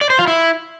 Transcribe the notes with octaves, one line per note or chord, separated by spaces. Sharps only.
D5
C5
F4
E4